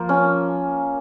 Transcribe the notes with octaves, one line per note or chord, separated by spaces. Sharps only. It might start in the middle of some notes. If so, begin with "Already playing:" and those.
Already playing: F3 A#3
C#4